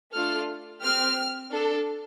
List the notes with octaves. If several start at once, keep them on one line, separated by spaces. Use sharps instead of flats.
A3 D4 F4 A4 F6
C4 G4 F6
D4 A4